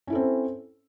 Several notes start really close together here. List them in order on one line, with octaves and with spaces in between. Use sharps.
C#4 E4 A4 C4